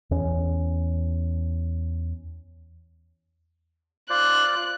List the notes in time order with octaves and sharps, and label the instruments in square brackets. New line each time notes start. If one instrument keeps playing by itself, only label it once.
[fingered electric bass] E2 C#4
[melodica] F4 C5 D5 [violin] F#6